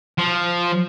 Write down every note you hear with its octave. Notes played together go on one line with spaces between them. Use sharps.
F3